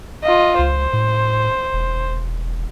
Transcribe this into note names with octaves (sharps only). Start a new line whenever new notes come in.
F4 D#5
C#2 C5
A2
E1